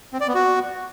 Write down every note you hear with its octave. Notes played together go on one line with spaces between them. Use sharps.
C4
D5
B3
F#4